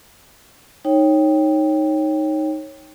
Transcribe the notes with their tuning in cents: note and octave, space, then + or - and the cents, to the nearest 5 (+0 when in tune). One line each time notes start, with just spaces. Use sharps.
D#4 +0 C#5 -15 G5 +5